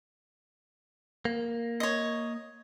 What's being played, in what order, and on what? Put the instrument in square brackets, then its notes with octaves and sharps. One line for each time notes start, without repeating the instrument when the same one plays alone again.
[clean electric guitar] A#3
[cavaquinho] C#5 D#5